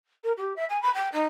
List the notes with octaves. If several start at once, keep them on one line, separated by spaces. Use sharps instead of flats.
A#4
G4
E5
G#5
B5
G5
D#4